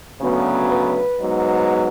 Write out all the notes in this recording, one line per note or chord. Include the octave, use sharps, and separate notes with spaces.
D2 C#3 F#3 B3
B4
G#2 F#3 B3